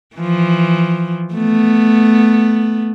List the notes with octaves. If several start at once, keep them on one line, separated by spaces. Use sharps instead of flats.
E3 F3
A3 B3